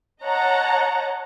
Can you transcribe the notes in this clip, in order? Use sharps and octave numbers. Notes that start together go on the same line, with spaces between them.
C#5 D#5 F#5 A5 A#5